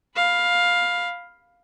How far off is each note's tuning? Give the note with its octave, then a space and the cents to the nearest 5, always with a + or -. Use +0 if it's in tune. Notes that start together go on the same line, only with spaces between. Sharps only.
F5 +10 B5 +0